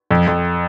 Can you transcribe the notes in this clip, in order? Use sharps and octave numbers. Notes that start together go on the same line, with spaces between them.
F2
F2